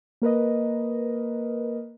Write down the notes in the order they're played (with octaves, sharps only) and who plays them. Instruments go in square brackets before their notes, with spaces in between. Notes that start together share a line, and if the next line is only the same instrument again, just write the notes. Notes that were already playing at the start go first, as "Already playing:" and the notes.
[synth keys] A#3 A#4 B4 D#5